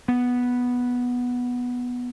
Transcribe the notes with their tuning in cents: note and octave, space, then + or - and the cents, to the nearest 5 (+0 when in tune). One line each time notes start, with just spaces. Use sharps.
B3 -5